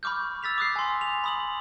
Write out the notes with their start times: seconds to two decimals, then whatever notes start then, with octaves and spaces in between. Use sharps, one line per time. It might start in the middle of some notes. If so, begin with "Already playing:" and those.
0.03 B5 C#6 D6 F6 G6
0.43 E6 A6 B6 F7
0.58 D6 D#6 F#6 C7
0.76 G#5 C6
1.01 F7
1.24 B5 D#6 F#7